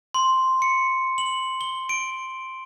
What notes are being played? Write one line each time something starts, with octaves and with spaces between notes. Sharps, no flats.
C6
C#7
F#7
G7
D7